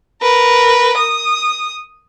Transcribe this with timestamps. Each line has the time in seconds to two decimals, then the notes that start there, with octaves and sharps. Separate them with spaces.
0.22 A#4 B4
0.97 D#6